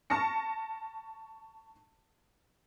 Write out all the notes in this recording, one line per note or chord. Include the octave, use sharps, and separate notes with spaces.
A5 C#6 F6 A#6 C#7